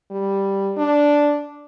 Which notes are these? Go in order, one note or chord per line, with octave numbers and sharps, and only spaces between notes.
G3
D4